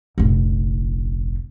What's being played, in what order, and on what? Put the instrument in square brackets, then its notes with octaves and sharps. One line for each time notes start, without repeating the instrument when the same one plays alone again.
[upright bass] F1 A#1